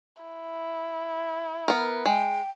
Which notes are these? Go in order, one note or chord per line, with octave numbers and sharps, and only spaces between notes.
E4
B3 A#4
G#3 G5